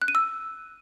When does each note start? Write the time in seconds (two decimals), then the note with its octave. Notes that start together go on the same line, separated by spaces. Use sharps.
0.02 F#6
0.08 D#7
0.15 E6